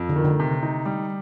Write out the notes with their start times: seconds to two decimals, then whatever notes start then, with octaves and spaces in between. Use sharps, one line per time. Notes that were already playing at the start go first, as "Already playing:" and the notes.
Already playing: F2
0.09 D3
0.16 D#3
0.24 D3
0.40 C3
0.63 D#4
0.85 G3